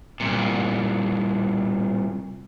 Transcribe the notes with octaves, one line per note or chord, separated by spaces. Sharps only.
C2 A#2